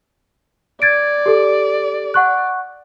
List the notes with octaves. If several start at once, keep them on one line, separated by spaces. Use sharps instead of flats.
D5 G#6 A6 D7
G4 A4
F#5 C#6 F#6